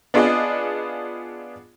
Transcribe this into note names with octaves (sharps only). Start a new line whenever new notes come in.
B3 D4 F4 G#4 D#5